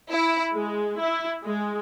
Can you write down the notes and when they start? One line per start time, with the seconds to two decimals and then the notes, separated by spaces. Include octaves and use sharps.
0.11 E4
0.53 G#3
1.01 E4
1.44 G#3